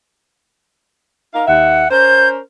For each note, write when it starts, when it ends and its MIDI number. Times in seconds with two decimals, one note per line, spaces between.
1.34 1.43 63
1.34 1.43 70
1.34 1.43 77
1.47 1.84 39
1.47 1.84 76
1.47 1.91 78
1.91 2.39 61
1.91 2.39 70
1.91 2.39 72
1.91 2.29 91